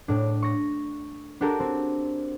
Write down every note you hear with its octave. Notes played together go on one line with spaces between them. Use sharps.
A2 D4
C#6 A#6
D4 F#4 G4 A4 A#4
C4